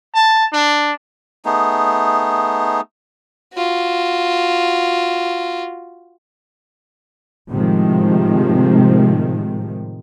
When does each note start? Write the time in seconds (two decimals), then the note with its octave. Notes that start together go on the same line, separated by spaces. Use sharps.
0.15 A5
0.53 D4
1.45 A3 B3 D#4 G#4
3.54 F4 F#4
7.51 A2 C3 D#3 F3 G#3